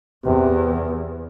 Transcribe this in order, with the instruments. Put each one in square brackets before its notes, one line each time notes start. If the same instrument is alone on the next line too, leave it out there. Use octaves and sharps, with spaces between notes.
[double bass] E2 [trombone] C3